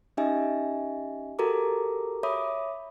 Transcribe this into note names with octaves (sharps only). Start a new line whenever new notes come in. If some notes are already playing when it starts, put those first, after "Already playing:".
C#4 D#4 G4 D#5 E5 G#5
F#4 G4 A4 A#4 A#5 D6
C#5 E5 B5 D6 D#6